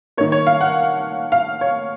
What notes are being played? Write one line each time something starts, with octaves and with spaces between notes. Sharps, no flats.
D#3 A#3 C#5
C#5
F5
F#5
F5
C#5